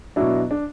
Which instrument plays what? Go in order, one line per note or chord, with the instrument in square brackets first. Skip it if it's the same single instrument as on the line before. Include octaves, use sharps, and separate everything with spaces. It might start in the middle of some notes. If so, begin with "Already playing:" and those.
[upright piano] B2 F#3 D4 E4
D4